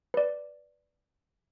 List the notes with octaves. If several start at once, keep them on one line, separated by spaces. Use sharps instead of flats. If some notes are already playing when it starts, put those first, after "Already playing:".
B4 D5